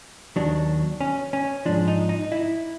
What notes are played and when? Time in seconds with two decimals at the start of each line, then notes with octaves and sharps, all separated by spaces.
0.36 D#2 D#3 F#3 D4
1.01 C#4
1.33 C#4
1.66 G#2 F3 D4
1.88 D#4
2.09 D#4
2.32 E4